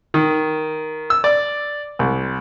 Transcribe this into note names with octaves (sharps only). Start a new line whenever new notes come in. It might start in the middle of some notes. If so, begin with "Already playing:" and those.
D#3
E6
D5
C2